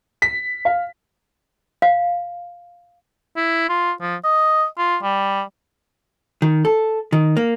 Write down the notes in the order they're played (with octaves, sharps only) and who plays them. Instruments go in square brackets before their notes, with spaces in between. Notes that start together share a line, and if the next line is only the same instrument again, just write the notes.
[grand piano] B6
F5
[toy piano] F5
[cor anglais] E4
F4
F3
D#5
F4
G3
[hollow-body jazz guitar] D#3
A4
D#3
A#3